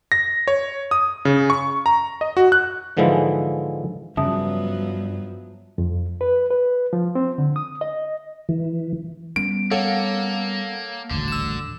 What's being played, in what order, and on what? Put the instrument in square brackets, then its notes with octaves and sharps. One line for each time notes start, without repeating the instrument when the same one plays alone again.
[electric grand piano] A#6
C#5
D#6
C#3
C#6
A#5
D#5
F#4
F#6
[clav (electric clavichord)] G#2 D3 E3 F3 G#3 E4
[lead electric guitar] G2 [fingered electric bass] C#3 [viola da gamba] F3 F#3 B3 [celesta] E5 A5 D#6
[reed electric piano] F2
B4
B4
F3
C4
D3
D#6
D#5
[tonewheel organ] E3
[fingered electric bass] G3 B3 C#4 [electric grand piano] D7
[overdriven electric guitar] A#3 [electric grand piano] A4 [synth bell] C#5 F5 F#5
[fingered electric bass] D#1 A1 D2 [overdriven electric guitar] D3
[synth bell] E6 E7